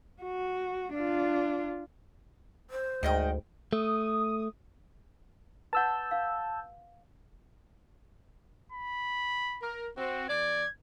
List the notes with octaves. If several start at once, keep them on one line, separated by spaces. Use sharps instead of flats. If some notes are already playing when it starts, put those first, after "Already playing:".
F#4
D4 F4
C5
D2 G#2 D#3 D#5 G5
A3 D#6
B4 F#5 A5 E6 G6
F5
B5
A#4
C4 F#4
E2 D5 G#6